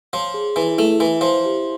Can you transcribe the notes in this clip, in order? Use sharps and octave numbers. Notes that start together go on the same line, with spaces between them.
F3 C#5
G#4
E3 E4
A3 E4
E3 E5
F3 C5
G4